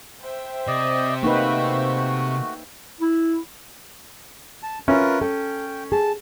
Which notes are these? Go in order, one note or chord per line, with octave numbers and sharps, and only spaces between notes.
C5 E5 G5
C3 D5 D#5
A3 A#3 D#4 F#4 B4
E4
A5
C#4 F4 A#4 B4 E5
A4 G5
G#4 A5